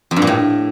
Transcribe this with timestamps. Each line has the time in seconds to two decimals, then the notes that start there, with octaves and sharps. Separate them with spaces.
0.11 F2
0.16 G2
0.22 A#2
0.27 A2